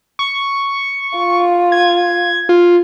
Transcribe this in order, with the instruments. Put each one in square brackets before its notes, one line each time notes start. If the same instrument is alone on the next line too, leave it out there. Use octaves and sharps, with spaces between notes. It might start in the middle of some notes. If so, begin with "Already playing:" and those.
[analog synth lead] C#6
[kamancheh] F4
[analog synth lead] G#6
F4